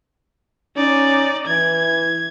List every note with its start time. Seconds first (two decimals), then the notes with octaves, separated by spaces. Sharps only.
0.76 C#4 D#4 D5
1.48 E3 G#6